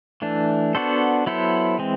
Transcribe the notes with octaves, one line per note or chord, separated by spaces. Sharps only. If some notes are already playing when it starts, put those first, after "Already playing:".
E3 A3 D4
B3 D4 F#4 A4 C5
F#3 B3 E4 A4 C5
E3 G#3 C4